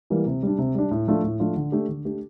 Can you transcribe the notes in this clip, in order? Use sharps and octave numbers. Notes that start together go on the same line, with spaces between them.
E3 G3 A#3
C3
G3 D4
C3
G3 D4
A2
F3 A3 D4 F4
A2
F3 A3 D4 F4
D3
A3 D4 G4
D3
A3 D4 G4